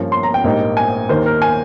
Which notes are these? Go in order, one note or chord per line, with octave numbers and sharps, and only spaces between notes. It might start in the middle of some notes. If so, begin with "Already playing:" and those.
Already playing: G2 F3 A#3 C#4
C6
A#5
G5
A#1 G#2 G3 A#3 D#4
G#5
D#2 D#3 A#3 C5
A#4
G#5